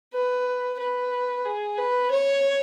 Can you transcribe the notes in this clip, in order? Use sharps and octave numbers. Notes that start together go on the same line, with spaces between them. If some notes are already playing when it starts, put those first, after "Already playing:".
B4
B4
G#4
B4
C#5